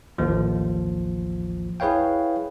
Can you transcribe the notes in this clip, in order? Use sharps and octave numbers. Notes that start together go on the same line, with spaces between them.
A1 D#2 F3
E4 G#4 B4 C#5 F5 G5